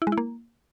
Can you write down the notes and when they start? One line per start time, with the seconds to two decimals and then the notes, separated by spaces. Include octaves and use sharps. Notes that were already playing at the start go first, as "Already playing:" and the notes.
0.02 E4
0.07 G#3
0.12 E4
0.18 A#3